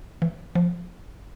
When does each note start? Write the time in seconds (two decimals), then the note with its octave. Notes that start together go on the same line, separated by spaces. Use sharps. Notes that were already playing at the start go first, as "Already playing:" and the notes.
0.22 E3
0.55 F3